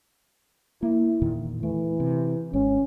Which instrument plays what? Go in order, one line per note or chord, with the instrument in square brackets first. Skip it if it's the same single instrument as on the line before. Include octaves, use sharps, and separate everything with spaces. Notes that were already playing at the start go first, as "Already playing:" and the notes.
[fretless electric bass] A#3 [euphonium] E4
[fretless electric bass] E2 A#2 D#3
[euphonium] E3 [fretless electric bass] A3
[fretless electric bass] C3
[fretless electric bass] G#1 G#2 [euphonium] C#4